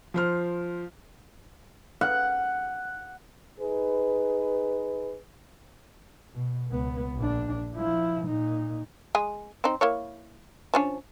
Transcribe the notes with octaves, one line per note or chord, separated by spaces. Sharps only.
F3 C5 F6
F#5
D#4 G#4 B4
B2
C#2 B3
A#1 D4
F3 E4
A#2 D#4
G#3 G#4
C4 D#4
A#3 E4 C#5
F3 C#4 D4